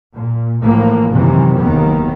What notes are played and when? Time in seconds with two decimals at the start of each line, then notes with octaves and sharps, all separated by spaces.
0.14 A#2
0.61 A2 E3 F3 A#3
1.11 F#2 C3 D#3 E3
1.59 F#1 D#2 D#3 B3